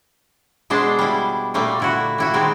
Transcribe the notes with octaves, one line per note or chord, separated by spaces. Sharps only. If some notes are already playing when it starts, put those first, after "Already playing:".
B2 G#3 D4 C5 A5
G3 E4
A#2 G3 A3 A#3
D3 E4 F#4
G3 E4 F#4
D#3 G#3 C4